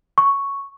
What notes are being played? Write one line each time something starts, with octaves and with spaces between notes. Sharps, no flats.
C#6